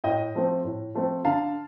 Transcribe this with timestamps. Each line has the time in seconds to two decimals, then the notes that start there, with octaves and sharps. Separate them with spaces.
0.04 A2 D#5 G5
0.35 F3 A3 C4
0.64 A2
0.94 F3 A3 C4
1.25 D3 F5 A5